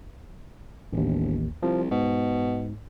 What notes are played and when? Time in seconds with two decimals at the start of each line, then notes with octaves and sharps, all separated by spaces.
0.93 E1 A1 D#2
1.63 C2 F3
1.91 G#2 B2